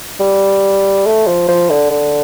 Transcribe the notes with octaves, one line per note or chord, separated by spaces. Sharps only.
G3
A3
F3
F3
D3
D3